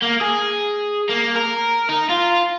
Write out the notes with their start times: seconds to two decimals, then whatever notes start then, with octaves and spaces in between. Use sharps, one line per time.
0.02 A#3
0.21 G#4
1.09 A#3
1.36 A#4
1.89 D#4
2.09 F4